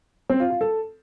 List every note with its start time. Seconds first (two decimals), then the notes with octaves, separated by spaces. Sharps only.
0.29 C4
0.40 F4
0.50 F4
0.61 A4